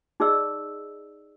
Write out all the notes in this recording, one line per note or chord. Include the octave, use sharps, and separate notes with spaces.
D#4 G#4 D5 D#5 E6